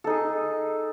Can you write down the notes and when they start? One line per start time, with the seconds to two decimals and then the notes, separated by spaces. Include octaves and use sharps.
0.04 A4
0.07 D#4
0.10 G#4